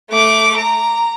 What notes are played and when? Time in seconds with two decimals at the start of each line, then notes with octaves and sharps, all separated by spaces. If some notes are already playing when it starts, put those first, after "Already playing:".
0.11 A3 D6
0.58 A#5